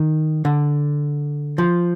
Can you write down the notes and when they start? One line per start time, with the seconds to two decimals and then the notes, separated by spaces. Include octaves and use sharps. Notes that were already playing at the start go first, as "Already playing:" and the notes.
Already playing: D#3
0.45 D3
1.58 F3